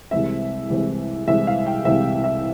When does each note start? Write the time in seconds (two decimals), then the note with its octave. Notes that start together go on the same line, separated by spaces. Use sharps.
0.11 C2 C3 E3 G#3 C4 E5
0.70 C2 C3 E3 G#3 C4
1.27 C2 C3 E3 G#3 C4 E5
1.47 F5
1.66 G5
1.85 C2 C3 E3 G#3 C4 E5
2.24 E5